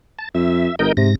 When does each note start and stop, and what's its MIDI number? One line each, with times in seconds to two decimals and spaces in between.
0.19 0.29 81
0.35 0.68 41
0.35 0.75 76
0.79 0.91 31
0.79 0.92 70
0.79 0.92 75
0.79 0.92 91
0.97 1.15 44
0.97 1.10 48
0.97 1.15 94